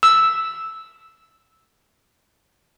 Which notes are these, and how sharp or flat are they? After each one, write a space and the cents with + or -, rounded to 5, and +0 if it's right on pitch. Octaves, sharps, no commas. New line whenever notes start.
E6 -5